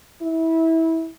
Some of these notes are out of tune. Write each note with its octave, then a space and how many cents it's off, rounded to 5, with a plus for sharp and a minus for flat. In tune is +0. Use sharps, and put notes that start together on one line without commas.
E4 -20